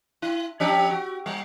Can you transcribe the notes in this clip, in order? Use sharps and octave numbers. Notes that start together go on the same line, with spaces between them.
E4
F3 C#4 G4
F#4
G3